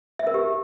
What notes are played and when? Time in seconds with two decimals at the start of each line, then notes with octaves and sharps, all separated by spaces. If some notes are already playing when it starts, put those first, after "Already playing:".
0.19 E5
0.27 A#4
0.34 G4